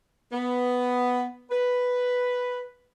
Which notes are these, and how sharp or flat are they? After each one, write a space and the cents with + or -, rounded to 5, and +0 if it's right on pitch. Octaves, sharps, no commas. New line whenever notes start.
B3 +5
B4 +0